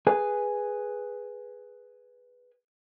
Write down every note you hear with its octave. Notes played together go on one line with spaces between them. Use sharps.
G#4 B4 G#5